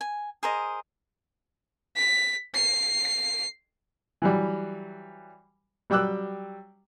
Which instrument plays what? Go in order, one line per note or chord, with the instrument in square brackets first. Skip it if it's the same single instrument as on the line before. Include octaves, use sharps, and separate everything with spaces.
[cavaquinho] G#5
G#4 A#4 C5 D#5
[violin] B6
C7
[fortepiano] E3 F#3 G3
F#3 G3 G5 D6 E6 F#6